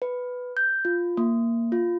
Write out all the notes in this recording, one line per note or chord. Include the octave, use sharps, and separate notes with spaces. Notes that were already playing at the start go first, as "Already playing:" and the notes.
B4
G6
F4
A#3
F4